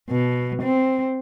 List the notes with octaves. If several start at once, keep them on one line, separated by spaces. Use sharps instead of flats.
B2
C4